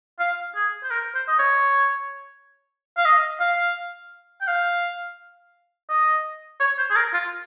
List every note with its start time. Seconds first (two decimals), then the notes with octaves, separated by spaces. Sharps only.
0.19 F5
0.55 G#4
0.83 C5
0.91 A#4
1.15 C5
1.28 D#5
1.39 C#5
2.97 F5
3.05 D#5
3.40 F5
4.41 G5
4.47 F5
5.89 D#5
6.60 C#5
6.78 C5
6.90 G#4
6.96 A#4
7.14 F4